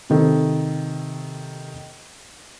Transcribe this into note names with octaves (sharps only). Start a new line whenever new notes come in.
C3 D#3 A4